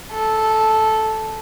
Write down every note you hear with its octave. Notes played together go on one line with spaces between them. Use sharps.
A4